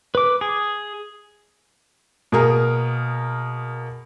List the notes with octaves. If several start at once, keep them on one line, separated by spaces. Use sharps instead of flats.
B4 D6
G#4
B2 A#3 G#4 A#4